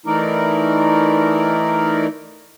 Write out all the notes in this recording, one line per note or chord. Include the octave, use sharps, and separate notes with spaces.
E3 A3 D#4 E4 A#4 D5